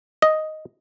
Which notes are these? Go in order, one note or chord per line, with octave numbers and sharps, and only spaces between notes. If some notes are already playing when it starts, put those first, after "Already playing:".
D#5